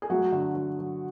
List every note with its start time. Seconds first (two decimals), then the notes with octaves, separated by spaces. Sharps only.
0.02 G#4
0.10 F#3 A3 F#4
0.32 D3
0.55 F#3
0.79 F#3